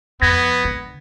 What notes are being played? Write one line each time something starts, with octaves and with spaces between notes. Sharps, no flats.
F2 B3 G#6 A#6
D3